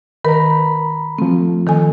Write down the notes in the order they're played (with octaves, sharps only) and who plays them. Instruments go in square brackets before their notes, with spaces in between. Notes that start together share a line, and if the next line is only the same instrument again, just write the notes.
[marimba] D#3 A#4 B4 [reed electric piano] A#5 B5
[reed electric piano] F3 A3 [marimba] C4
[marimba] D#3 A4 G#5